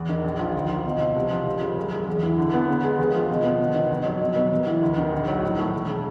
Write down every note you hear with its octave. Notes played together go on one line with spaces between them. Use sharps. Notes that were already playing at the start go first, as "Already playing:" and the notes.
Already playing: E2
D#3
A#1
F3
D2
F3
B2
C4
C2
F3
G#1
C#3
F#2
G#3
E2
E3
D3
B3
C#3
G#3
D#2
F3
B2
B3
G1
D#3
F2
F#3
B2
B3
D#2
E3
D2
D#3
A#1
F#3
A2
A3
E1
C#3